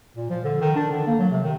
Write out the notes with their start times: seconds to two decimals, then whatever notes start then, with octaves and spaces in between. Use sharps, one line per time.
0.16 A#2
0.29 F3
0.44 D3
0.61 D#3
0.75 D4
0.92 D3
1.07 A#3
1.19 F#3
1.31 C3
1.44 D#3